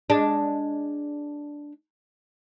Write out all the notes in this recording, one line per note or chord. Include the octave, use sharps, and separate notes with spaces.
G#3 D4